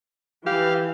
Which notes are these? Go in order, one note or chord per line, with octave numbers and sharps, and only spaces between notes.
E3 G4 F5